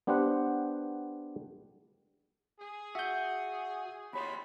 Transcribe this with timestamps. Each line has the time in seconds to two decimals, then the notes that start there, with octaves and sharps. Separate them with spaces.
0.07 B3 D4 G4 B4 C5 F#5
2.60 G#4
2.95 F#4 E5 G6
4.13 D#2 C#5 B5 C6